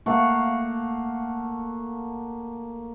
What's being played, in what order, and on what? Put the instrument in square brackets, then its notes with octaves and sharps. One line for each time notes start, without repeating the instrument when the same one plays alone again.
[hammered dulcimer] A3 A#3 F5 F#5